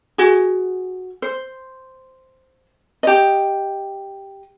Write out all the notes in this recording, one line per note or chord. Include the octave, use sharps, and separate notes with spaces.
F#4 G#4
C5
G4 D#5